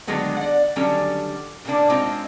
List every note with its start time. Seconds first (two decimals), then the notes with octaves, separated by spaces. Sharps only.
0.07 D3 D#3 F#3 G#3 A3 B3
0.37 D5 F#5
0.76 D3 D#3 F#3 G3 A3 C#4
1.65 A2 C#3 A#3 D4
1.90 G#3 C4 C#4 D#4 F4